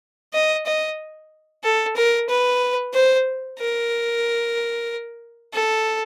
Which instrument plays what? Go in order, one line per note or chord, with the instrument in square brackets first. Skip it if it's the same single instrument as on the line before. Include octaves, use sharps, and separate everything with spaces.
[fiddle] D#5
D#5
A4
A#4
B4
C5
A#4
A4